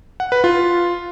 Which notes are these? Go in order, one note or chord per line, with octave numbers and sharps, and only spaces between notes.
F#5
B4
F4